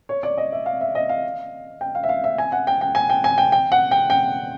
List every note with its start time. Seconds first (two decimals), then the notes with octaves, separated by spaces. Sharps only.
0.09 C#5
0.23 D5
0.38 D#5
0.52 E5
0.66 F5
0.81 E5
0.95 D#5
1.09 F5
1.81 G5
1.95 F5
2.04 E5
2.09 F5
2.24 E5
2.38 G#5
2.52 F#5
2.67 G5
2.81 G5
2.95 G#5
3.10 G5
3.24 G#5
3.38 G5
3.52 G5
3.72 F#5
3.91 G5
4.10 G5